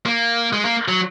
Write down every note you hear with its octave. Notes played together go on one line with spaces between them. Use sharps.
A#3
G#3
A#3
F#3